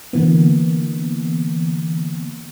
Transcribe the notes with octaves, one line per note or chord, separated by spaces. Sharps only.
D3 E3 A#3 B3